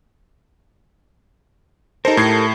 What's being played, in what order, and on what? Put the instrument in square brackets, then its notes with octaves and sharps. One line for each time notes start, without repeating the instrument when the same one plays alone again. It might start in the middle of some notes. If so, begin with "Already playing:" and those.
[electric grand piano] D#4 C5 [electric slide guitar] G4 A4 A#4
[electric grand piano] A2 G#6 C7